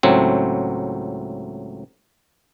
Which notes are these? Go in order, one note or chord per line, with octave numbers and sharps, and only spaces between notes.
C#2 A2 F#3 C4